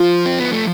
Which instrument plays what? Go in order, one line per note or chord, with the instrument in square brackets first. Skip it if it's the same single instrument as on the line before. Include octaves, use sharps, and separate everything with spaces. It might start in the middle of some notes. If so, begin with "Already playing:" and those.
Already playing: [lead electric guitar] F3 [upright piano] F4
[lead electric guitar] C4
B3
A3